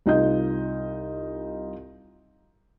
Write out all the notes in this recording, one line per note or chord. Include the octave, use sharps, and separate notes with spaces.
C2 D#4 F4 D#5 G6